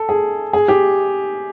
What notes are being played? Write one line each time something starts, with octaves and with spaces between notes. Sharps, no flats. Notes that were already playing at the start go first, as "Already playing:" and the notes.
Already playing: A4
G#4
G#4
G4